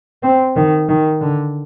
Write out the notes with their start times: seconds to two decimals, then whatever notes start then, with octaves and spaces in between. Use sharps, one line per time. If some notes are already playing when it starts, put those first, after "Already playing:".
0.23 C4
0.56 D#3
0.89 D#3
1.21 D3